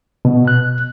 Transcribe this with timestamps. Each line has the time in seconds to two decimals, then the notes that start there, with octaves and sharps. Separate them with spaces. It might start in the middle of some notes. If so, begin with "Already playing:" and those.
0.25 B2
0.48 F#6